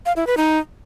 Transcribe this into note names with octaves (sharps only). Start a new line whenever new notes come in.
F5
E4
B4
D#4